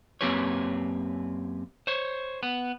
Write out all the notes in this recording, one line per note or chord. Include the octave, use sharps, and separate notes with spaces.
F#2 A#3 C4 G4 B4 C#5
C5 C#5
B3